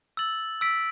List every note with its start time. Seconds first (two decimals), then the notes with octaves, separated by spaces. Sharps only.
0.17 E6 A6 F#7
0.61 E6 B6 D7